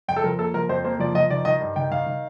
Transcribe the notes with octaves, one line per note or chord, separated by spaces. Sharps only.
F2 G5
A4
F3 A#4
A#3 A4
F3 A#4
F2 C5
A#3 C5
F3 D5
F3 D#5
D#3 D5
D#3 D#5
G2
D#3 G5
D#3 F5
D#3